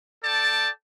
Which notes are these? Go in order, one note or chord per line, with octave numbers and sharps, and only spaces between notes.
A4 D5 G5 A5